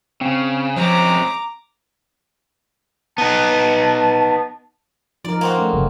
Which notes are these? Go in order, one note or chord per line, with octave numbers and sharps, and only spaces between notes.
C#3 C4
F3 G#3 C4 C#4 A#5 D6
B3 D#4 A5
F3 D#4 A#4 D5
A#3 C4 F#4
G#3 A3 C#4
F#1